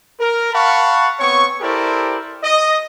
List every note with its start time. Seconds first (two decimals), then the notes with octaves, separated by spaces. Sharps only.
0.19 A#4
0.53 F5 F#5 A5 B5 C#6
1.20 B3 C4 C#5 C#6
1.61 E4 G4 A4 A#4 C5 D5
2.43 D#5